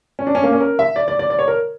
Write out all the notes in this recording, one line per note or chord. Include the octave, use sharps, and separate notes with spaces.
C#4
D4
C#4
A#3
C#4
A#4
E5
D5
D5
D5
D5
C#5
A#4